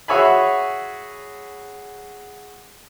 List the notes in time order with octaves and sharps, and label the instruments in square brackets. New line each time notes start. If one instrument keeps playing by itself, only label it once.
[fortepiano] F#4 G#4 C#5 E5 G#5 B5